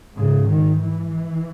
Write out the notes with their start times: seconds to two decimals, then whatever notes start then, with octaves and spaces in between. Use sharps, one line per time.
0.16 G#2 C#3
0.48 D#3
0.79 E3